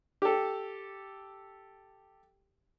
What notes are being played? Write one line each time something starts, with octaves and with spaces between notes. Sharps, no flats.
G4 A4